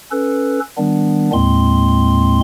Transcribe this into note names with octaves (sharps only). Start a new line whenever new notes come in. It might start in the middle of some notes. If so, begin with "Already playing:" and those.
C#4 A4 B4
D#3 G3 B3 D4
D#2 A2 G#3 C4 C6